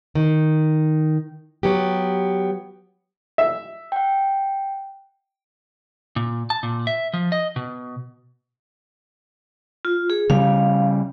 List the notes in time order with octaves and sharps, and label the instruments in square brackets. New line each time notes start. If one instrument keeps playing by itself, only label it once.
[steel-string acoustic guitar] D#3
F#3 B3 G4
[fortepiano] E5
[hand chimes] F#5 G5
[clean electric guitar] A#2
A5
A#2
E5
F3
D#5
B2
[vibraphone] F4
G#4
[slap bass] C#3 G3 [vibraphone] F5